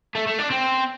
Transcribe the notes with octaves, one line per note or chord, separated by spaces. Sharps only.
A3
A3
D4
C4